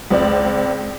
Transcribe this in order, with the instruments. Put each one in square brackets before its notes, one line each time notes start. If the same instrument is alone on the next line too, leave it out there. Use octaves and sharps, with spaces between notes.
[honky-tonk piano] C#2 C4 D5